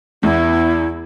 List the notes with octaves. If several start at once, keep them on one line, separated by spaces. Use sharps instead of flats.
E2 B3 E4